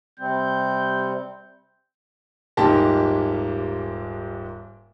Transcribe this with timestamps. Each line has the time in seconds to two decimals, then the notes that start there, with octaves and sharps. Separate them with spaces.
0.20 C3 G3 C4 G6
2.57 D#1 G#2 A#3 G4 A5